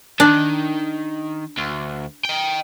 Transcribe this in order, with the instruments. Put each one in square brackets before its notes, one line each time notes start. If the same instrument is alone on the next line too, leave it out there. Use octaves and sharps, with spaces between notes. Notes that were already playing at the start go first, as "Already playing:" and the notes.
[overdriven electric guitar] D#3 [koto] D4
[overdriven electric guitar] D2
D#5 G5